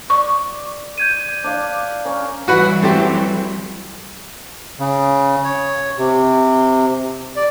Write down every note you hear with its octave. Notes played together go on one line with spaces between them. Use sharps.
D5 C#6
G6 G#6 D#7
D4 D5 F5
C#4 A#4
E3 F#3 G3 F#4 B4 F#5
A3 C4 G4
C#3
C#5
C3
D5